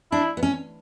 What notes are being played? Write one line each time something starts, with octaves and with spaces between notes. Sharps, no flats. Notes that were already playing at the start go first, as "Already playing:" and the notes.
D4 E4
B3
C#4